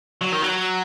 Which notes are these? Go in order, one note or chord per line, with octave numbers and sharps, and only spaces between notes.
F#3
D#3
F#3